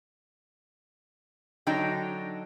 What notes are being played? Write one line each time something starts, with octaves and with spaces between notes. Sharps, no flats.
D3 F#3 D4 D#4 G5